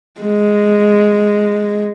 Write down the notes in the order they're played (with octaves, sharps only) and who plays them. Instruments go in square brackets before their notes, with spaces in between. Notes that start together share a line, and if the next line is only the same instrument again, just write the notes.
[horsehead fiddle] G#3